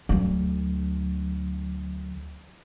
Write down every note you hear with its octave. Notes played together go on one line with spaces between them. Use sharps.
D2 F#3